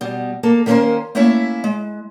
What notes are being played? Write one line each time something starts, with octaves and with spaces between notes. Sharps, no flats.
B2 G3
A#3 A4
D#3 A#3 C#4 A4 A#4 C5
A3 A#3 C#4 E4 C#5 E5
G#3